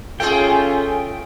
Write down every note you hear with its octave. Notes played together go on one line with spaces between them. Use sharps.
A3 C#4 F4 G#4 G5